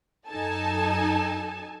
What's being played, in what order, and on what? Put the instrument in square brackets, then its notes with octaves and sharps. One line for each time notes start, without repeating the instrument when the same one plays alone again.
[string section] F#2 D#4 A4 G#5 A5